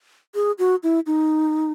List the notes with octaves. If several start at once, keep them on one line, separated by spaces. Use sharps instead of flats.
G#4
F#4
E4
D#4